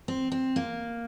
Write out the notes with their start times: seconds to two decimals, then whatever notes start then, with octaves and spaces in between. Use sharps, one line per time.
0.08 C4
0.32 C4
0.56 A#3